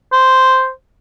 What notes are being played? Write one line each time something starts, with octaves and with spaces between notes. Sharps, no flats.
C5